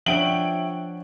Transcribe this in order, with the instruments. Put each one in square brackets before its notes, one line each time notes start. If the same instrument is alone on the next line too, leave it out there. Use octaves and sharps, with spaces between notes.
[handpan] F3 D4 C#5 [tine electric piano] E5 F#5 G5 [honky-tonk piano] D7 F#7